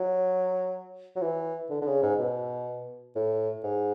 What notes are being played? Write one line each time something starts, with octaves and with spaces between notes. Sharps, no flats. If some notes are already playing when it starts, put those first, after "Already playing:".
Already playing: F#3
F#3
E3
D3
D3
C#3
G#2
B2
A2
G#2